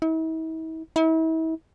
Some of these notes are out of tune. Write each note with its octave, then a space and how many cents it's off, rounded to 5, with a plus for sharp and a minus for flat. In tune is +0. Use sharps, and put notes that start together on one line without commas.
E4 -45
E4 -40